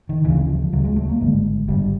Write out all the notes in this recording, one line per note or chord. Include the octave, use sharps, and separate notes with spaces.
D#3
D2 C#3 E3
F3
D2 C#3 F#3
G#3
A3
A#3
G#1 G2 D3 G#3
G#1 G2 D3 G3